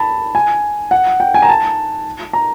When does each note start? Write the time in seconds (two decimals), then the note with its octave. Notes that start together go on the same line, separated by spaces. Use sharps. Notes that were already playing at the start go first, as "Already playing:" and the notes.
Already playing: A5 B5
0.35 G#5
0.91 F#5
1.20 G5
1.34 G#5
1.42 A#5
1.49 A5
2.33 A#5